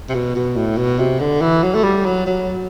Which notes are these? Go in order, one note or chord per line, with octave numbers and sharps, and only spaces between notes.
C3
B2
B2
A2
B2
C3
D3
E3
F#3
A3
G3
F#3
F#3